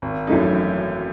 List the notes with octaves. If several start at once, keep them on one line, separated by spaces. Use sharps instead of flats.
G#1
F#2 E3 A3 D#4